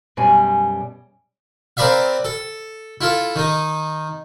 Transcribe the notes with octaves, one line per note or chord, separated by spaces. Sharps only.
F#2 B2 G3 G#5
C4 A#4 B4 D5 E5 F5
A4
E4 F4 A4
D#3 D#4